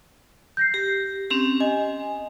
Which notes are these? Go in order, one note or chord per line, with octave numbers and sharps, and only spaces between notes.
G6 A#6 C7
G4
C4 C#4 G4
D#5 G#5